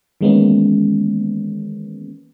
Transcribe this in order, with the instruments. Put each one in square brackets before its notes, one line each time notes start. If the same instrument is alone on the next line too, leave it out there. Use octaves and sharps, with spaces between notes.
[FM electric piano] D#3 E3 G#3 A#3 B3 C#4